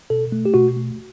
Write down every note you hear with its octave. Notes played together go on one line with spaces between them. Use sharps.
B2 A4
A3
G4
B2 F#4
A3